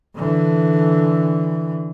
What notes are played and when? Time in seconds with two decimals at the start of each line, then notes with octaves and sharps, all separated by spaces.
0.16 D3 E3